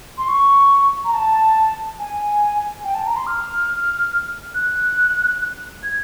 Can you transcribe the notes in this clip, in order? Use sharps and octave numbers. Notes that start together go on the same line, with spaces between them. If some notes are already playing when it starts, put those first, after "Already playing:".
C6
C#6
A#5
A5
G#5
G5
A5
A#5
C6
F6
F#6
G#6